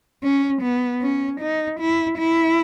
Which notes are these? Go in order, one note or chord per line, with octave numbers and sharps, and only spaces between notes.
C#4
B3
C#4
D#4
E4
E4